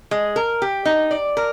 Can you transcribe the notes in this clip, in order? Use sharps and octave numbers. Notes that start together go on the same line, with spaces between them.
G#3
A#4
G4
D#4
D5
A#4